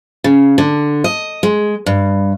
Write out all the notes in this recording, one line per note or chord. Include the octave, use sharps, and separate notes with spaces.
C#3
D3
D#5
G#3
G2